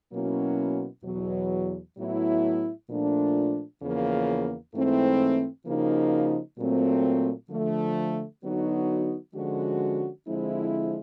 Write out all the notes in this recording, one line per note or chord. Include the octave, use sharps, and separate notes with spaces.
B2 F#3 A#3 C#4 E4
E2 B2 F#3
A2 F#3 B3 E4
A#2 F3 A3 D4 F4
E2 C#3 F3 A#3
G#2 E3 A3 C4 E4
C#3 F3 A#3 D#4 F#4
A#2 F#3 A3 C4
D3 F3 A3
D3 F#3 B3 D#4 F#4
D3 F3 G#3 C#4 F#4
D3 F3 G#3 C4 E4